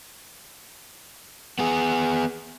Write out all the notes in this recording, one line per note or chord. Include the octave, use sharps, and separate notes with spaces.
B3 G#4